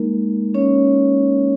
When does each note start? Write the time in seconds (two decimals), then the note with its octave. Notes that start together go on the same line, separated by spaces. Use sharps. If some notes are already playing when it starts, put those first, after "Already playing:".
Already playing: G#3 A#3 D#4 A#4
0.54 C#4 C#5